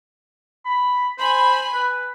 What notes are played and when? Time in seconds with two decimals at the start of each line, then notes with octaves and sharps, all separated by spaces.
0.65 B5
1.18 C5 G#5 B5
1.74 B4